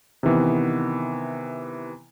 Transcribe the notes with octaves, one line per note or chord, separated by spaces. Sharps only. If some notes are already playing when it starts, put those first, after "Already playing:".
C3 D#3 E3 B3